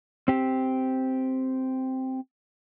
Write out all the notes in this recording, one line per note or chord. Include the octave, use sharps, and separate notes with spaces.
C4 G4